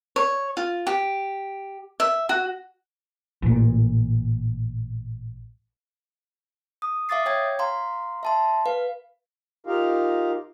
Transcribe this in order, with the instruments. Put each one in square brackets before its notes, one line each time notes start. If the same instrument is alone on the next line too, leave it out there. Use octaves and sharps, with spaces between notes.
[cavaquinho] C#5
F4
G4
E5
F#4
[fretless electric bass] A1 A#2
[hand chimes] D#6
E5 F5 D6 D#6 A6 C7
C#5 G5 G#6
F5 A#5 C6
E5 A5 C6
B4 F5
[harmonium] D#4 F4 G4 A#4 F5